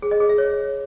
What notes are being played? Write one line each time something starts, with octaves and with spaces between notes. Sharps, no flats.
G#4
D#5
G#4
E5
C#5